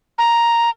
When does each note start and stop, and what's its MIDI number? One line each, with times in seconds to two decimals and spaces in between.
0.18 0.70 82